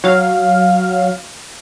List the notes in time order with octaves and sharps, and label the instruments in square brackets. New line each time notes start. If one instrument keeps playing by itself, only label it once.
[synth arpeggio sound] F#3 F5